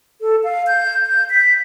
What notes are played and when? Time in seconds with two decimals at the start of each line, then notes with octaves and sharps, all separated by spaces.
0.21 A4
0.44 F5
0.67 G6
1.06 G6
1.30 B6